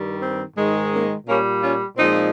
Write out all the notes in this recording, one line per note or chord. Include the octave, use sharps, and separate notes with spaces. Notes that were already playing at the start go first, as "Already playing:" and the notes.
Already playing: G2 D#3 G3
C4
G#2 D#3 G#3
A#3 C#4
A#2 G3 A#3 C#4
C#4 F4
A#2 F3 G#3 C4 D#4